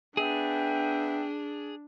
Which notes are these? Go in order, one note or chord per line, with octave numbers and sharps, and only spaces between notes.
B3 D4 G#4 E5 G5